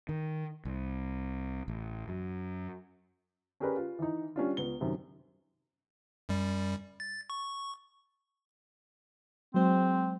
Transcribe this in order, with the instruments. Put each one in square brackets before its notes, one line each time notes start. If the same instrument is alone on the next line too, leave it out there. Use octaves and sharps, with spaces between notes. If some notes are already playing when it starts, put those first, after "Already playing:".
[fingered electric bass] D#3
C2
A1
F#2
[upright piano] C#4 G4 G#4 A#4 B4 D5
F4
E3 D#4
G3 C#4 D4 F4
C#2 B3 G7
F#2 C3 D#3
[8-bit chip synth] F#2 G3
A6
C#6
[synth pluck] F#3 G#3 C5 [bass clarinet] C4